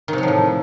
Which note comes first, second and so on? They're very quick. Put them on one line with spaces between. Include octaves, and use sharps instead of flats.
D#3 C3 F#3 F3 A2